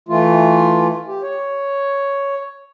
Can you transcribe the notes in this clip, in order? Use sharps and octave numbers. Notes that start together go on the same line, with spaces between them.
E3 A3 F4
G4
C#5